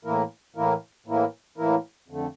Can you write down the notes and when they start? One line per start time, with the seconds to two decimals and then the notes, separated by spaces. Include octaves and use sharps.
0.05 A2 E3 A#3 E4 A#4
0.56 A2 E3 A#3 E4 A#4
1.06 A2 E3 A#3 E4 A#4
1.58 A2 E3 A#3 E4 A#4
2.08 F2 D3 A3